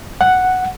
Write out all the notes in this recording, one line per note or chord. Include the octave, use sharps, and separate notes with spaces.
F#5